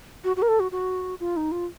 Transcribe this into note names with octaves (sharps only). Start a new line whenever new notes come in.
F#4
F#4
A#4
A4
F#4
F#4
F4
D#4
F4